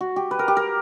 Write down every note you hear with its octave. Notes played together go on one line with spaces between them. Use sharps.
F#4
G4
B4
A#4
G4
A#4